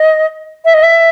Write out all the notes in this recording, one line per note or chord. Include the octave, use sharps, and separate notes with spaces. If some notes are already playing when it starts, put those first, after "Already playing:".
Already playing: D#5
E5
D#5
E5